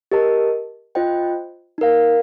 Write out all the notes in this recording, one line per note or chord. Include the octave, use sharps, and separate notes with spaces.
G4 A#4 D#5 A5
F4 C5 D#5 G5
D#4 A#4 F5